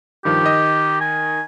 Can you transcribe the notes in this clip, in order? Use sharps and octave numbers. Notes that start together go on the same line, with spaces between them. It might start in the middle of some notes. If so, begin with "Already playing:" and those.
G2 D#3 F3 G4
D#3 D#5
G#5